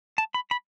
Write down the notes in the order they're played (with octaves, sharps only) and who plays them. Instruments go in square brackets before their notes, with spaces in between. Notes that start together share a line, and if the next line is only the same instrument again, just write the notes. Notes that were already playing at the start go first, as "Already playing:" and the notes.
[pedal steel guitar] A5
B5
B5